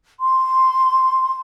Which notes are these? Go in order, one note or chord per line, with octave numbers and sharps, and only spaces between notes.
C6